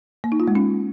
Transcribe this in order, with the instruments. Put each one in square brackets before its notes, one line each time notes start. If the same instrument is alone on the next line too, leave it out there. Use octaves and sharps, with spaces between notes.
[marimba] A#3
D#4
F4
G#3
C#4